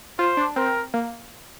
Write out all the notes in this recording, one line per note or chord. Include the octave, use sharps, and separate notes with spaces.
F4 C5
D4
C4 A#4
A#3